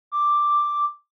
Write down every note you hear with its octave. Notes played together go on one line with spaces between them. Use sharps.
D6